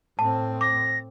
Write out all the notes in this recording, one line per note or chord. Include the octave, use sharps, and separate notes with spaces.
A2 C4 A5
D6 A#6